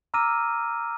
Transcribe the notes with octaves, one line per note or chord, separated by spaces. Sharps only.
A#5 D6 E6 F6 A#6 D#7